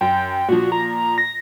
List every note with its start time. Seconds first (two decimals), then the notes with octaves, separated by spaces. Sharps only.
0.01 F#2 G5
0.49 A#2 F3 F#4
0.72 A#5
1.18 A#6